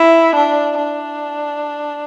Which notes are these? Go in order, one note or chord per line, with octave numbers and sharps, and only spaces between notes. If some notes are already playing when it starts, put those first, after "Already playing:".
Already playing: E4
D4
D4